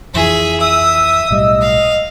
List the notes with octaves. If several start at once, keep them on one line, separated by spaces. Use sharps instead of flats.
F2 E3 F3 G#4 E5
E5 D#6 E6
B1 A2 G3 D#5
F5